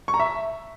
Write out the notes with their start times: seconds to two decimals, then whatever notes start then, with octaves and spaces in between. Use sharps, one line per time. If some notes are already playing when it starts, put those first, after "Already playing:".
0.08 C#6
0.14 A#5
0.19 E5